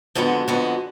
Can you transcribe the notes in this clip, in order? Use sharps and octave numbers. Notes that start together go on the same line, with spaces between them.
F2 D3 G#3 B3 F#4
F2 D3 G#3 B3 F#4